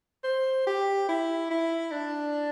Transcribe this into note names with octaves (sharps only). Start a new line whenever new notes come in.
C5
G4
E4
E4
D4